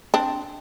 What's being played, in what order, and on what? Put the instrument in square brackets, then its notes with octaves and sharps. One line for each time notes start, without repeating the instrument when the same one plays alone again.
[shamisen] C4 D4